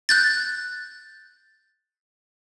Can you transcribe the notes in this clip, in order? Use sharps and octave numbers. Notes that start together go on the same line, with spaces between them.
F#6 G6 A6